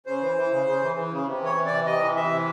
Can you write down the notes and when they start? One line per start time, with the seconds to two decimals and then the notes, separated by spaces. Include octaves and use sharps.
0.06 C#3 C5
0.22 E3
0.36 E3
0.51 C#3
0.67 C#3
0.82 E3
0.96 E3
1.11 C#3
1.26 C3
1.42 E3 C#5
1.56 E3
1.66 C3 D5
1.86 C3 D#5
2.01 E3
2.16 E3 E5
2.31 C3